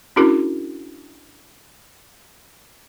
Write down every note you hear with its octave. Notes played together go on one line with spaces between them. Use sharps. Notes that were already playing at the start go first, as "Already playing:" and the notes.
C#4 D4 E4 F#4 G#4 A#4